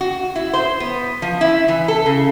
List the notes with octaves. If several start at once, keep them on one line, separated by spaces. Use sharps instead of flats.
F#4
E4
C5
B3
F3
E4
E3
A4
C#3